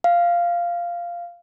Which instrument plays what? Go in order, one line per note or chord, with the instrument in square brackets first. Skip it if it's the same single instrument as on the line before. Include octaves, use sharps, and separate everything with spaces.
[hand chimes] F5